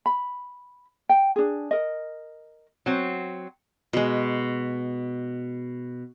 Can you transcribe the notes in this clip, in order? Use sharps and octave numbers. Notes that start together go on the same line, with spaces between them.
B5
G5
D4 G#4
A#4 D#5
F#3 C4
B2 G#3